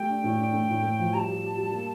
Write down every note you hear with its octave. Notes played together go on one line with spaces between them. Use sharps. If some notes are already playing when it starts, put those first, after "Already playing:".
Already playing: A3 G4 G5
D4
A2
D4
A3
A2
A3
F3
G3 A5 A#5
G4
G4
G3
A#3